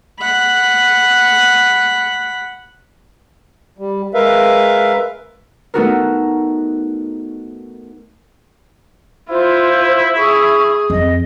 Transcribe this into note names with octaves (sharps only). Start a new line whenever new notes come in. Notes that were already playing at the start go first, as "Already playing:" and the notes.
F#5 B5
G3
G#3 A#4 B4 E5 F5
A3 B3 D#4 F#4 A4 A#4
E4 F4 C5
G#4 C#6
F2 D#5